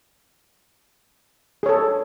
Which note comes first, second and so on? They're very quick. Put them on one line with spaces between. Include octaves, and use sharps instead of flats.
G#4 C#5 A4